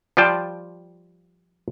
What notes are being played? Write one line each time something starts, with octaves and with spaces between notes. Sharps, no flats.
F3 G3 F4 D5 G5 A5